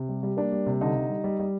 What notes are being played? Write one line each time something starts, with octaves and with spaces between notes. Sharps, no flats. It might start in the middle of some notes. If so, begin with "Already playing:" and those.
Already playing: C3
G3
G3
A#3 D4
G3
C3
D3 D#4
D3
G3
G3
G3